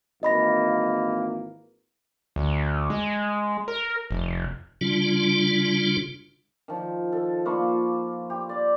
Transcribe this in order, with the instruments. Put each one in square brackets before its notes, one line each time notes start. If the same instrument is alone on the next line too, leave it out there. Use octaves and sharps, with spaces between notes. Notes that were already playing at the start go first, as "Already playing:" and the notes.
[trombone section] G#1 E3 A#3 [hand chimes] D#5 B5 A#6
[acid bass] D2
G#3
A#4
F1
[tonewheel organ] C#3 G3 D4 F4
[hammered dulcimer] D#3 F3
A4
A#3 F4 B5 C#6
G4
D5